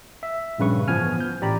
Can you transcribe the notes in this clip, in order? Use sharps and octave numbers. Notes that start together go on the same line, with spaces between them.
E5
A#1 G2 C#3 B4 C#6
A1 F3 B3 G#5 F6
G6
A1 G4 D5 A#5 B5